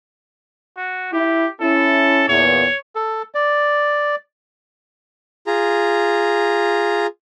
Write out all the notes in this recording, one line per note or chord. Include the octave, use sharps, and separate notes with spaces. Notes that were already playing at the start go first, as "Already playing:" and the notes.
F#4
E4 G4
C#4 E4 A4
E2 A#2 C#5
A4
D5
F4 G#4 A#5